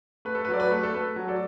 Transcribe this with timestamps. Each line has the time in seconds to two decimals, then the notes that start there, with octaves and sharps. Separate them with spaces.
0.25 A3 B4
0.35 A4
0.45 B4
0.49 F#3 D5
0.60 B4
0.71 A3
0.83 A4
0.93 A3 B4
1.16 F#3
1.28 A4 D5